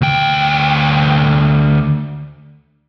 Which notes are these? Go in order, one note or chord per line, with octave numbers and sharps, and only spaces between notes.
D2 G5